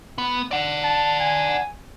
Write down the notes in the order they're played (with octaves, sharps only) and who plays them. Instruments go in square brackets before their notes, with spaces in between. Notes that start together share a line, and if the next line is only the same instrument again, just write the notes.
[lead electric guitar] B3
D5 F#5
[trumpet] A5
G#5